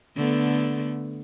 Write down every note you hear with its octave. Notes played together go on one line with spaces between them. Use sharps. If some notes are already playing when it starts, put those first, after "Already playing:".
D3 A3 B3